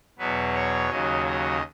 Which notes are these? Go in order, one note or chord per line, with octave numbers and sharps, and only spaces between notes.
E2 B2 F#3 B4
C#5
D#2 C#3 F#3 D#5
D#5